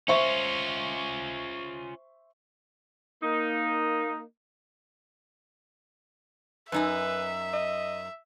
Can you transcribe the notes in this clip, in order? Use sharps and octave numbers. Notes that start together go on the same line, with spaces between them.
C#4 F4 C5 E5 C#6
A#3 D#4
F#2 D#4 B4 E5 G#5
D#5